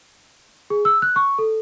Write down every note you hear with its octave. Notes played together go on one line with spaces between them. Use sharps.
G#4
E6
F#6
C#6
A4